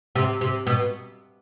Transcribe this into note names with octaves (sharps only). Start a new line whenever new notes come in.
C3
C3
B2